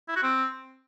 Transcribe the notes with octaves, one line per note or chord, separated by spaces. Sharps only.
E4
F#4
C4